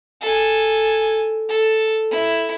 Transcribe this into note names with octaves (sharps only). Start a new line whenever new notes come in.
A4 G#5
A4
E4